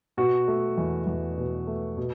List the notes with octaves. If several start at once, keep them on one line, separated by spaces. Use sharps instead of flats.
B2 F#4
A3
E2
E2
B2
A3
B2